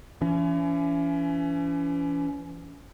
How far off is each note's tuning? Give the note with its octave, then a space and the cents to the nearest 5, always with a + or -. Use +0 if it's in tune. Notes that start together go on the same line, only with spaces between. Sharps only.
E3 +35 C#4 +35